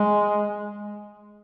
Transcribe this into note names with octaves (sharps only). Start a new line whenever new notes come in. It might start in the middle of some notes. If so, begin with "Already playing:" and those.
Already playing: G#3